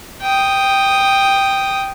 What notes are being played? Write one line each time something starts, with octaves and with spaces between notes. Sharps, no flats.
G5 D#6